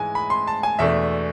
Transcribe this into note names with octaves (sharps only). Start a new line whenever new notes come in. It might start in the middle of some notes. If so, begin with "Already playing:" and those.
Already playing: G#2 E3 G#3 G#5
B5
C6
A5
G#5
E2 B2 A3 D4 E5